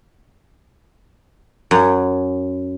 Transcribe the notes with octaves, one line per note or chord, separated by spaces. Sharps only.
F#2